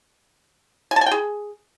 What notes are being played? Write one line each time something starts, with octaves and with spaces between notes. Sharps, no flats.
G#5
A5
G#5
G5
G#4